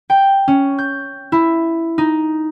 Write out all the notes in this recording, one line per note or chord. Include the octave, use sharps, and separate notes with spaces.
G5
C#4
G6
E4
D#4